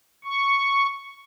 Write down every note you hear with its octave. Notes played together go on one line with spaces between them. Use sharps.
C#6